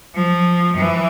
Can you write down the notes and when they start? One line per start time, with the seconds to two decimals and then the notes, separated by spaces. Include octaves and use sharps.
0.15 F3
0.77 E3